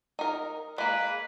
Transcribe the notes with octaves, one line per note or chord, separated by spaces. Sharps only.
D#4 A#4
G#3 A#3 B4